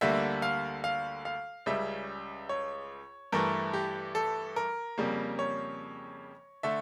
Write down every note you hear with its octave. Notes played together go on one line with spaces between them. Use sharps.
D2 D3 G3 A#3 E5
F5
F5
F5
C#2 C#3 G3 E5
C#5
G2 E3 A3 A#4
G4
A4
A#4
F2 C#3 G3 A#3
C#5
D3 A3 E5